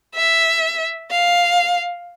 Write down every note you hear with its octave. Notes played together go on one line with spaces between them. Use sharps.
E5
F5